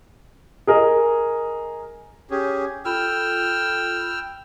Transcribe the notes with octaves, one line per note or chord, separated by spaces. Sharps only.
G#4 A#4 D#5
C#4 G4 G#4
F4 A4 G5 B5 E6 F6